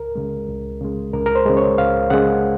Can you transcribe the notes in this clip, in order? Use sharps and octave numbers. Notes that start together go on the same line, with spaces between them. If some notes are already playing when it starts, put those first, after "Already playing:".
Already playing: C#2 A#4
C#3 G#3
C#2
C#3 G#3
C#2 A#4
A#4
C5
C#3 G#3
C#5
C#2 F5
C#3 G#3 F#5